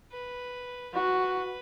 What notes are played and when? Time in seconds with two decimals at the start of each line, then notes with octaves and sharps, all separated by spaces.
0.12 B4
0.94 F#4 B4